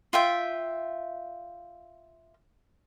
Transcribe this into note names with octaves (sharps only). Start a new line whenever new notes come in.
F4 E5 G5